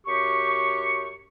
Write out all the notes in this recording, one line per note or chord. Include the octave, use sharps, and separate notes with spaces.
F#2 G4 C#6